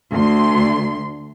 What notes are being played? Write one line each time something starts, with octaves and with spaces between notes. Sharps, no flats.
D2 C6